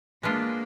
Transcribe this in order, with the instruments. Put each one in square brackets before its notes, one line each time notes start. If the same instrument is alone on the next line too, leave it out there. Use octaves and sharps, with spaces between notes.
[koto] G#3 B3 D4 F4 [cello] A#3